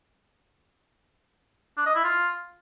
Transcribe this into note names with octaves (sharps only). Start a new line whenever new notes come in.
D4
D#5
E4
F4